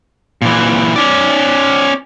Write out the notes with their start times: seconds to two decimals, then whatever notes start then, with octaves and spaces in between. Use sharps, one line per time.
0.42 A#2 E3
0.96 C#4 D5